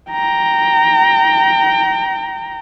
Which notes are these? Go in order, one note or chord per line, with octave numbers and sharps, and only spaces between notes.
G5 A#5